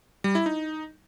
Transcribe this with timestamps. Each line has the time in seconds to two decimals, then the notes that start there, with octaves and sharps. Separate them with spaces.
0.24 G3
0.35 E4
0.46 D#4